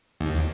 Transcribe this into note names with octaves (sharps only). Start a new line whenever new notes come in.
D#2